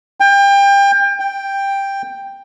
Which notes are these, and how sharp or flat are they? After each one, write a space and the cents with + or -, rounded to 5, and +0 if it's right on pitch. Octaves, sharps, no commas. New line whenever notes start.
G5 +30
G5 +5